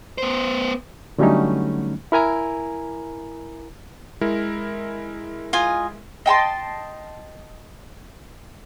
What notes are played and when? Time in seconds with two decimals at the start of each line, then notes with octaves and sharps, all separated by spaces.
0.18 B3 C5
1.18 D3 F#3 G3 A3 C#4 D#4
2.12 E4 A#4 G#5 A#5
4.21 G#3 E4 A#4
5.53 F4 D#5 G#5
6.26 D#5 G5 A5 C6